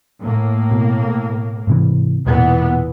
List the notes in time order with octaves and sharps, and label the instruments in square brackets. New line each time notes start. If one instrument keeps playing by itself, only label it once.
[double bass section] A2 A#3
[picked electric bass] B2
G#2 C3 E3
[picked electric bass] E1 [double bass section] A#2 E3 B3